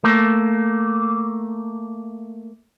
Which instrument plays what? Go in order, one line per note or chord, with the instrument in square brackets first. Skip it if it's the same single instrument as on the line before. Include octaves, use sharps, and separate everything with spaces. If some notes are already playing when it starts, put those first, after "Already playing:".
[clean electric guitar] A3 A#3